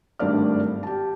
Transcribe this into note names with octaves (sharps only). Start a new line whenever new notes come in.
G#1 G2 A3 D5 F6
G4 A5